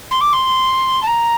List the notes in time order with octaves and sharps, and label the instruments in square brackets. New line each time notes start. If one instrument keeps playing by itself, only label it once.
[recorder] C6
D6
C6
A5
A#5